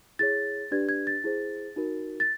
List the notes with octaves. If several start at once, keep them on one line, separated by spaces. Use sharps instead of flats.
E4 G#4 C#5 A6
D4 G4 B4 D5 G#6
G#6
A6
E4 G#4 C5
D#4 F#4 A#4
A6